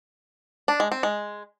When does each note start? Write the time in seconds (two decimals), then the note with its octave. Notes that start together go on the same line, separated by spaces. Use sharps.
0.68 D4
0.80 G#3
0.92 C4
1.03 G#3